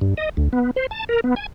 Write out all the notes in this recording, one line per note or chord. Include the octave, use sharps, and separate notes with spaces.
G2
D#5
D2
B3
C5
A5
A#4
B3
G#5